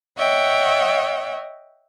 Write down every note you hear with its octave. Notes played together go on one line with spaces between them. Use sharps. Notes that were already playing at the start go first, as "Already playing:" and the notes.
C#5 D#5 E5 F#5 G5